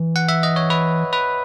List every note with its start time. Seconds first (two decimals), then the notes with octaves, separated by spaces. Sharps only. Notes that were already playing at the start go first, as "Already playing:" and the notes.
Already playing: E3
0.16 F#5
0.29 E5
0.43 D#5
0.56 C#5
0.70 B4
1.13 B4